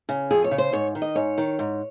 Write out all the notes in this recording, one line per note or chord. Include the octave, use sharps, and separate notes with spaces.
C#3
F2 G#4
C#5
C#3
C5
G#2 C#5
D#3
D#5
G#2 C#5
D#3
G#2